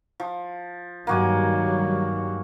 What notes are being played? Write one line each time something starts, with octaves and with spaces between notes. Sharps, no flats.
F3
G2 D#3 F#3 A#3 F#4 G#5